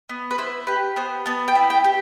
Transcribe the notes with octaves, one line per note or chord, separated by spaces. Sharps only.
B3
B4
E4 C5
G4 B4
B3 C5
B3 A5
G5
E4
G5
G4